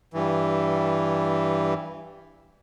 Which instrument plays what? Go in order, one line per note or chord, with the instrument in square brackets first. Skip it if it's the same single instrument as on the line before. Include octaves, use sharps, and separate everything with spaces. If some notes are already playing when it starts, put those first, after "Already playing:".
[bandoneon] G2 E3